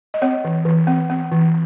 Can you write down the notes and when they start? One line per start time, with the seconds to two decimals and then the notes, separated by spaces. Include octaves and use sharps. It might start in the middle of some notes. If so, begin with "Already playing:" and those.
0.14 D#5
0.22 C4 C#5
0.44 E3
0.65 E3
0.87 C4
1.10 C4
1.32 E3